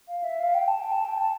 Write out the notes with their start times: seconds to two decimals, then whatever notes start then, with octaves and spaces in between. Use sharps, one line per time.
0.08 F5
0.23 E5
0.40 F5
0.55 G5
0.68 A5
0.80 G5
0.92 A5
1.05 G5
1.18 A5